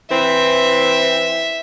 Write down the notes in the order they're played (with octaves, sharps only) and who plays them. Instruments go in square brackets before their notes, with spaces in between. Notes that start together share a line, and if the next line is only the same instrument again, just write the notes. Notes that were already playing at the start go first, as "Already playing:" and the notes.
[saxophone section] E3 C4 B4 [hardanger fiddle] E5